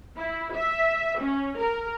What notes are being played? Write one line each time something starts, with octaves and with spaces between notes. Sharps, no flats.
E4
E5
C#4
A#4